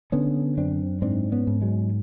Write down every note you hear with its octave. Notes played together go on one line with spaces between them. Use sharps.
D3 B3 C#4
F#2 C4 D4
G#2 C4 D4
B3 C#4
G#2
F#3 G#3